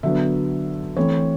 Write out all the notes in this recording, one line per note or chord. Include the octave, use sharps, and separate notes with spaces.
D3 F#3 B3 E5
E3 A3 C4 C#5